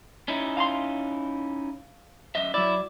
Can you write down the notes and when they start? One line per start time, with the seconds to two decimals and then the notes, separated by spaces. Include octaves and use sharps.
0.28 C#4 D#4 E4
0.57 F5 A#5 C6
2.35 F#2 D#5 E5
2.54 F#3 E4 D5